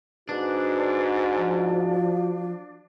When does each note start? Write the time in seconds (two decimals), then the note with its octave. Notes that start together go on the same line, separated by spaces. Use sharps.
0.29 G#2 D4 F#4 B4
1.38 F3